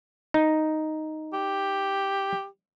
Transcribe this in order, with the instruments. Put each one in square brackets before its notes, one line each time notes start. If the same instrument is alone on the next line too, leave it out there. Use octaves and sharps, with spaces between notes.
[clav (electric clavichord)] D#4
[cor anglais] G4